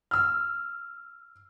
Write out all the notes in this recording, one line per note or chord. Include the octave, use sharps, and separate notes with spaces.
E6 F6